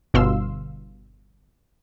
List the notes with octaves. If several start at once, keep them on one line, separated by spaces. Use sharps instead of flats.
G1 B2 F5 C6 E6